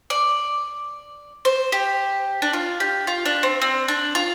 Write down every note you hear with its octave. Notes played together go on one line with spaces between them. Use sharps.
D5
C5
G4
D4
F4
G4
F4
D4
C4
C4
D4
F4